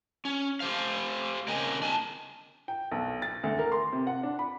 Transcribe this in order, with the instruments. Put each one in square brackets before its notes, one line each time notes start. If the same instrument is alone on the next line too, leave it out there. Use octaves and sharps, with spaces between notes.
[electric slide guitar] C#4
G4 C5 F5
C#3 A#3 C4 D#5 G5 G#5
D4 G#5 A5
[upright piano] G5
B1
A6
D2
A#4
C6
C3
F#5
D4
B5